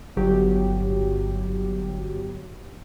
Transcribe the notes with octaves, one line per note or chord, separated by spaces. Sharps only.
G1 F#3 G4